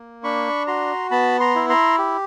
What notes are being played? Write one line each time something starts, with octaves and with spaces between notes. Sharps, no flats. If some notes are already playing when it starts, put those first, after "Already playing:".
Already playing: A#3
D4 B5 C#6
F#4 A#5 C6
B3 A5 B5
A#5 C6
E4
A#5 C6
G4